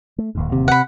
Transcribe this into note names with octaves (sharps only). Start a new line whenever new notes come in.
A3
D1 D#2 G#2
C3
F#5 B5